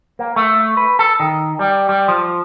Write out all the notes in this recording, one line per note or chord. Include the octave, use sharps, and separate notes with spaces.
A#3
A3
B4
A4
D#3
G3
G3
F3